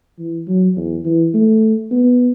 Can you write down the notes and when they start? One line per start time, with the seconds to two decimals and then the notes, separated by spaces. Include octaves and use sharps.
0.19 E3
0.48 F#3
0.77 E2
1.05 E3
1.34 A3
1.91 B3